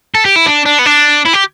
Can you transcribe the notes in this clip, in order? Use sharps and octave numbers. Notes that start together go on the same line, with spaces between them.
A4
G4
E4
D4
D4
B3
D4
E4
G4